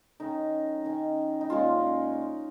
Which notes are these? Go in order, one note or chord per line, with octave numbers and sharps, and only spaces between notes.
D#3 C#4 D#4
D#3 C#4
D#4
A#2 G#3 C#4 F4